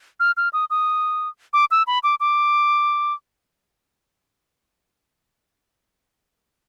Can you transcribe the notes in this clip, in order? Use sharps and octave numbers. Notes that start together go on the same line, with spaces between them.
F6
F6
D#6
D#6
D6
E6
B5
D6
D6